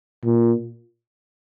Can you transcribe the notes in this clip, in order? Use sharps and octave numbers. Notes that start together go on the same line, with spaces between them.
A#2